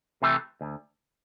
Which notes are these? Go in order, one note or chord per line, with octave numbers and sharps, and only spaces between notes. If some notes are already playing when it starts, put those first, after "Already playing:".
C3 E3 A3
D2